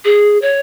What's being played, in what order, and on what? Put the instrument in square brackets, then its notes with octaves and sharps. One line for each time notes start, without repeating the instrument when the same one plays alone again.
[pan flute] G#4
C#5